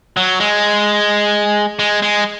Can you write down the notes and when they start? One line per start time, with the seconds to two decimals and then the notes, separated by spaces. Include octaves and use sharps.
0.17 F#3
0.40 G#3
1.79 G#3
2.02 G#3